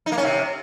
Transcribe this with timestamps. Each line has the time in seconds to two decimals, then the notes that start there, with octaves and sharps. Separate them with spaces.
0.06 D#4
0.12 A#3
0.18 C#4
0.23 C3